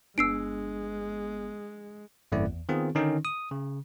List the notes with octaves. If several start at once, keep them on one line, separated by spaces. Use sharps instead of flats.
G1 G#3 B3 D4 E6 C7 D7
G#1 F#2 A3 C4 E4 D5
E2
D#3 B3 C4 F4 G#4
D3 D#3 C#4 D#4
D#6
C#3